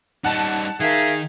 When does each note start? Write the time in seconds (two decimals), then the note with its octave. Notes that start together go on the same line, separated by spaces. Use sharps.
0.24 G3 D#4 F#5 A5
0.80 D#3 G#4 A#4 E5 F5